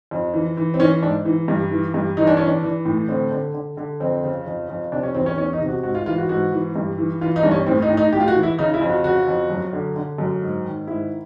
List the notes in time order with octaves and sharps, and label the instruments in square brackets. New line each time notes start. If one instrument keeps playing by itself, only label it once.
[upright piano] F2
E3
E3
C4
E3 C#4
G#2 D4
E3
G2
E3
G2
E3 D#4
D4
E3 C#4
D4
E3
A2
D3 C4
D3
D3
D3
F2 C4
C#3
F2
F2
C3 D4
C#4
E2 C4
C#4
E2 C#4
D#4
C3
F#4
G#2 F#4
F4
E3 F4
F#4
G#2 F#4
E3
G2
E3
E3 F4
D#4
G2 D4
C#4
A2 C4
D#4
A2
D#4
A2 G4
F4
F#4
E3
E4
C#3 D#4
E4
F2
F#4
C#3 F#4
F2
F#2
D3
D3
F#2
G#2
D#3
G#2 E4